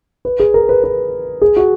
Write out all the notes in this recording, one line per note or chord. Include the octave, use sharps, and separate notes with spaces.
B4
G#4
A#4
B4
B4
G#4
F#4